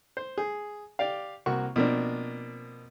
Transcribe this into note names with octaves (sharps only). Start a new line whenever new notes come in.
C5
G#4
G4 D5 F5
C2 A#3 F#4 C#6
B2 F3 A#3 C4 D4